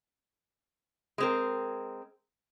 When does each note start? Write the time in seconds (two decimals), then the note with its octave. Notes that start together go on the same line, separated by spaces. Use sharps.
1.18 G#3 C4 A#4